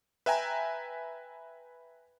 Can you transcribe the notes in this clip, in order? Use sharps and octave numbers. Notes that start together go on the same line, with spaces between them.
B4 E5 G5 G#5 A#5